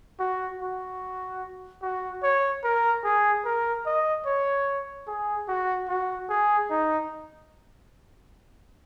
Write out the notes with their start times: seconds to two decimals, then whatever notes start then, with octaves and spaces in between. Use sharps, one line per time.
0.20 F#4
0.60 F#4
1.82 F#4
2.23 C#5
2.64 A#4
3.04 G#4
3.45 A#4
3.86 D#5
4.26 C#5
5.07 G#4
5.48 F#4
5.89 F#4
6.29 G#4
6.70 D#4